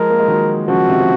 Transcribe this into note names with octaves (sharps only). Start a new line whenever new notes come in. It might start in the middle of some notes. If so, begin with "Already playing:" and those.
Already playing: F3 G#3 A#4
A#3
G#3
D#3 F#3
C#3 F3 F#4
C3 D#3
F3